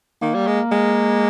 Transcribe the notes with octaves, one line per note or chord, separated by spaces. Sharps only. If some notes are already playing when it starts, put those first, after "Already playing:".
D#3 A#3
G3
G#3
G#3